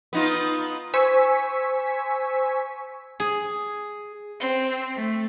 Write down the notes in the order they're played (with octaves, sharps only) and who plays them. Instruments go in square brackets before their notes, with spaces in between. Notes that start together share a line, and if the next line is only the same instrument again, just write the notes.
[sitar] B3 D#4 F4
[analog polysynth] C5 G#5 C#6 E6 B6
[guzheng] G#4
[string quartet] C4
A3